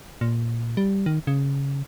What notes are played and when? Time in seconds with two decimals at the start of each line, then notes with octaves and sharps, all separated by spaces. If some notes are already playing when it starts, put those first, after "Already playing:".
0.21 A#2
0.77 G3
1.06 D#3
1.27 C#3